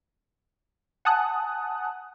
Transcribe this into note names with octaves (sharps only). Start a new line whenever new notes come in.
F#5 G#5 A5 D#6 F#6